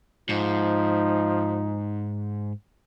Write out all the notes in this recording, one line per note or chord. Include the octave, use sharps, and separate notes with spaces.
G#2 F3 D#4